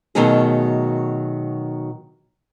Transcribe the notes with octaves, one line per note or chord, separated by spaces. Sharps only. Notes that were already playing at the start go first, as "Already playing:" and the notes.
B2 D#3 F#3 A3 C#4 G#4